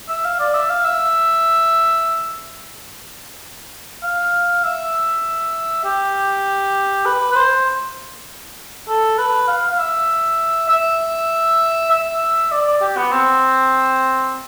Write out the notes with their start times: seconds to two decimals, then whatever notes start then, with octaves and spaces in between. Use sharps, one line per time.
0.09 E5
0.25 F5
0.40 D5
0.54 E5
0.69 F5
0.85 E5
4.03 F5
4.64 E5
5.84 G4
7.06 B4
7.32 B4
7.36 C5
8.88 A4
9.18 B4
9.48 F5
9.71 F5
9.79 E5
10.69 E5
11.91 E5
12.52 D5
12.67 D5
12.81 G4
12.97 B3
13.12 C4